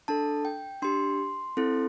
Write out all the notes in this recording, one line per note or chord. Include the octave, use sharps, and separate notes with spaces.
D4 A4 A5
G5
D4 G4 C6
C4 E4 A4